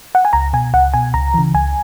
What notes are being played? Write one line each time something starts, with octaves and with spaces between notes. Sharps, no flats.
F#5
G#5
C#2 A#5
B2 G#5
C#2 F#5
B2 G#5
C#2 A#5
C#3 E3
C#2 G#5